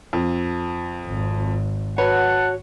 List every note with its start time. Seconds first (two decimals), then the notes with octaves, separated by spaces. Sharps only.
0.13 F2
1.06 G#1
1.98 F#4 B4 C#5 F#5 A5